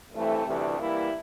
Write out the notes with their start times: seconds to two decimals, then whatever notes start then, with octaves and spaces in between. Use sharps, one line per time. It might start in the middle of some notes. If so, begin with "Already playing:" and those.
0.12 G2 E3 A3 C4
0.45 D2 C3 E3 G3 D4
0.79 E3 G3 A#3 E4